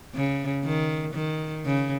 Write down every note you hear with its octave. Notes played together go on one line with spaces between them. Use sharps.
C#3
D#3
D#3
C#3